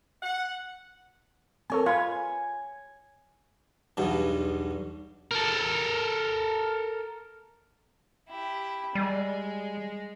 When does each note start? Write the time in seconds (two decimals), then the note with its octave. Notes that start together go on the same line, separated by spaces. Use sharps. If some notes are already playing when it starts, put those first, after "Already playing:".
0.23 F#5
1.70 C4 A4 A#4 C#5 G#5
1.86 F4 B4 C#5 F5 G#5 B5
3.97 B1 E2 G2 B2
5.31 A4 A#4
8.29 E4 G4
8.95 G3 G#3